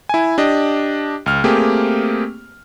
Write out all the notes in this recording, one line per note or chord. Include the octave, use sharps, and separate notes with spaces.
E4 G#5
D4 G4 D#5
C#2 F6
A3 A#3 C4 G4 G#4